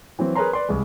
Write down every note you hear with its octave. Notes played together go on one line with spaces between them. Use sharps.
E3 F#3 C4
G#4 A#4 B4 C#5 A#5 C6
B4 D5 C6
C2 G#3